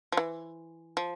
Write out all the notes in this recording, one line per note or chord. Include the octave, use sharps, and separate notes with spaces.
F3
E3
F3